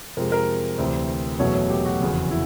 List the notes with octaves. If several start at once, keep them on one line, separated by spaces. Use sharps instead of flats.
F2 C3 F3 G#3 A#4
A#4
D2 C3 E3 C5
F#1 E2 B2 F#3 A3 C#5
C#5
G4
F#4
F1 E2 C#3
E4